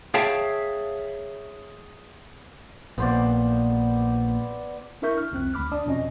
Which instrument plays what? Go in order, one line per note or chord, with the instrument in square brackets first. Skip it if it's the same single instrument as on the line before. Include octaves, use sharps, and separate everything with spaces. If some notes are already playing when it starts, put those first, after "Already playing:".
[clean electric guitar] G#4 C#5 E5 F5 G5 A5
[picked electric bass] A#1 [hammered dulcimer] B3 C5 D5
[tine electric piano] D4 E4 A#4 E5 C#6 G6
F6
C2 F2 C4 F#6
D2 B5 D6 F6
G#1 D4 D5 A5 D#6
F2 B2 C#4 D#5